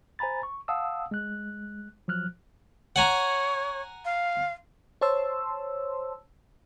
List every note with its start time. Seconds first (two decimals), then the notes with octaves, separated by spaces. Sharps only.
0.19 C5 G#5 A#5 B5 A6
0.43 C#6
0.68 F5 F#5 A5 D#6 E6
1.11 G#3 F#6
2.08 F3 F#3 F6 F#6
2.96 C#5 F#5 G#5 A#5
4.05 F5
5.01 C5 C#5 A5 C6 E6